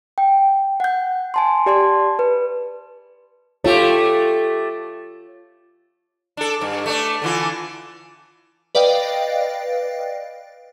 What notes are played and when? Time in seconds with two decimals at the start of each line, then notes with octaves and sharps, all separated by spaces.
0.18 G5
0.80 F#5 G6
1.34 G#5 A5 C6
1.66 G4 D5 A5 C6
2.19 B4
3.64 A3 F4 G4 C#5
6.37 D4 A4
6.61 G2
6.86 A3 D4
7.22 D3 E3 F4
8.75 B4 D5 D#5 F5 G5